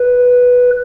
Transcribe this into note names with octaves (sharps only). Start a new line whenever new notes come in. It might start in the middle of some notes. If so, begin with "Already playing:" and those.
Already playing: B4